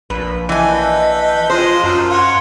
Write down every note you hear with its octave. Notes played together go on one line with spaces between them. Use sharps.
A#1 B4
E3 A4 B4 D#5 G5 G#5
G#3 D4 F4 C5 D#5
F#2 D3 F3 A#4
F4 F#4 C#5 C6